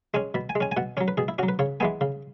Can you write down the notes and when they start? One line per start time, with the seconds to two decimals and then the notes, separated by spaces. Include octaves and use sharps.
0.14 G#3 C#4 G#5
0.34 B2 B5
0.49 G#5
0.55 G#3
0.61 C#4 G#5
0.72 G#5
0.77 B2 F#5
0.97 C#4 C#5
1.01 F#3
1.08 B4
1.17 B2 G#4
1.28 E4
1.39 C#4 F#4
1.43 F#3
1.48 B4
1.59 C#3 C#5
1.80 E3 G#3 B3 G#5
2.01 C#3